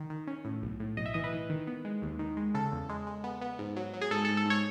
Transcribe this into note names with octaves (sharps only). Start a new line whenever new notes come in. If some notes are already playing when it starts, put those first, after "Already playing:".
Already playing: D#3
D#3
C#4
A2
B1
A2
B1 D#5
E5
E3 D#5
B4
E3
D#3
B3
G#3
D#2
D#3
G#3
C#3 A4
E2
G#3
G#3
B3
B3
G#2
F#3
F#3
G#4
G#2 A4
A4
G#2
A4
G#2 C#5